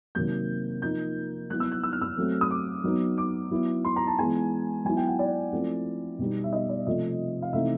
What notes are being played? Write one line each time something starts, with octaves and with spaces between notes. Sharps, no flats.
C3 D#3 F#3 A#3 G6
F3 A#3 D#4 G6
F#3 B3 E4 F#6
E6
F#6
E6
F6
E6
F#3 A3 C4
D#6
D6
F#3 B3 D#4
D6
F#3 B3 E4
C6
A#5
A5
E3 G#3 B3 G#5
F#3 B3 E4 G#5
G5
F#5
D5
F3 A3 C4 E4
B2 G3 B3 D#4
E5
D#5
D5
C3 F3 A3 D#5
F5
C3 E3 A3 C4 D#4 E5